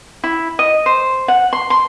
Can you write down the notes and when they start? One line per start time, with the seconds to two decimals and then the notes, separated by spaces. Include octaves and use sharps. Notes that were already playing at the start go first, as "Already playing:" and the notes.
0.24 E4
0.59 D#5
0.86 C5
1.28 F#5
1.53 C6
1.70 C6